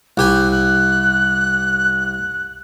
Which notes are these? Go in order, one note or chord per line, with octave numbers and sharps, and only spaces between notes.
C2 G4 G#5 F#6
F#6